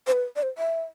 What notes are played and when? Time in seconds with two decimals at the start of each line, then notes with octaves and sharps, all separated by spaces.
0.07 C5
0.12 B4
0.36 D5
0.43 C5
0.58 E5